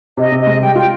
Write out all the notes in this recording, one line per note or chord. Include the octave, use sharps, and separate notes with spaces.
C3 D#5
C3
D#5
G#3
G3 G5
F4 G5